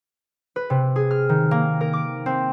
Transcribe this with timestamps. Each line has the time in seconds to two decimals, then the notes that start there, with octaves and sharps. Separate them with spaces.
0.56 B4
0.70 C3
0.96 G#4
1.11 F6
1.29 D#3
1.51 A#3
1.81 A#4
1.93 D6
2.26 C4